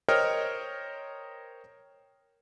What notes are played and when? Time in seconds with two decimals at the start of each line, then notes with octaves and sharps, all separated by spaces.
0.09 A#4 C5 C#5 D#5 G5 F6